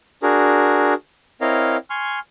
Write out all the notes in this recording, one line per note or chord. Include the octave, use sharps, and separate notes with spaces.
D4 F#4 G#4 A#4
C4 E4 A#4 C#5 D#5 F5
G#5 C6 C#6 F6